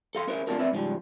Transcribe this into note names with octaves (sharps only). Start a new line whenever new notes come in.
A4 F5 C6
C#4 E4 A#4 C5
A3 A#3 C4 D4 F4 A#4
C4 B4 D5 E5
G#2 C#3 F3 G3